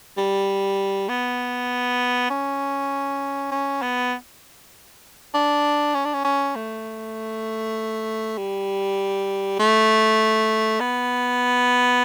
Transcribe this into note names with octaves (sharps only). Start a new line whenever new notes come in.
G3
B3
C#4
C#4
B3
D4
C#4
D4
C#4
C#4
A3
G3
A3
B3